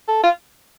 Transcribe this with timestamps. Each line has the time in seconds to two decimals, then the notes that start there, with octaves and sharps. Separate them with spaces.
0.08 A4
0.24 F4